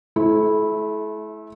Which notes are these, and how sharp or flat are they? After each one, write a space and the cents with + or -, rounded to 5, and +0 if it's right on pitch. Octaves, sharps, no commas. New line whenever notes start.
A3 -40 E4 -10 C5 +0